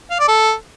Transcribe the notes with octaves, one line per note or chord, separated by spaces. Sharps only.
F5
D5
A4